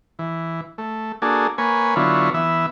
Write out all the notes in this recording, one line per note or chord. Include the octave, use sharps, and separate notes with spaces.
E3
A3
A#3 D4 F#4 G#4 A4
A#3 B4 C#5 G#5
D3 F#3 B3 E4 F4 C#5
E3 B3 E5